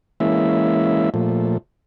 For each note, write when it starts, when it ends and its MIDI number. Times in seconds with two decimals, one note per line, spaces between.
0.20 1.10 52
0.20 1.10 56
0.20 1.10 58
0.20 1.10 61
0.20 1.10 64
0.20 1.10 76
1.14 1.58 46
1.14 1.58 53
1.14 1.58 57